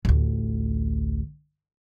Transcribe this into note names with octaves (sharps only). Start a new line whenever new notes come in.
A1 D2